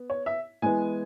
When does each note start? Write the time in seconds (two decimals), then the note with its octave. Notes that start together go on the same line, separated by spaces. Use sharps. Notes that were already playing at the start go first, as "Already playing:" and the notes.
Already playing: B3
0.10 C#5
0.26 E5
0.62 E3 G#3 B3 G#5